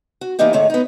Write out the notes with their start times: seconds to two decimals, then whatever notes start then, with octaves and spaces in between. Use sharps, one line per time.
0.21 F#4
0.39 E3 A#3 B3 D4 D#4 G4
0.53 G#2 D3 G#3 A3 C#5 F#5
0.70 B3 D#4